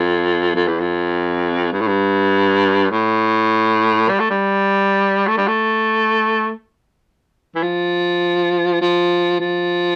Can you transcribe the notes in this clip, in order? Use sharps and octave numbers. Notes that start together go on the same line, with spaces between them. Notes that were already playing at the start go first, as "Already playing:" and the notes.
Already playing: F2
F2
E2
F2
G2
A2
G2
A2
G3
A3
G3
A3
G3
A3
E3
F3
F3
F3